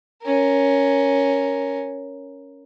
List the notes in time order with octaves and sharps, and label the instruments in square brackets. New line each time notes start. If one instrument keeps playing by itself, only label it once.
[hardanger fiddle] C#4 A#4